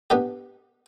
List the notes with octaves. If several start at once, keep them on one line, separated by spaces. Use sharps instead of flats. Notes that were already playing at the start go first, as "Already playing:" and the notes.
B3 D4 G4